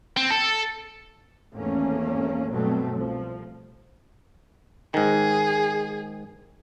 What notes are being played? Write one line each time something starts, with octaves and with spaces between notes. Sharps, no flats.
C4
A4
G#1 E2 A3 A#3 C#4
G2 B2 F#3 A3 C4
C2 F3
G#2 D#3 G#4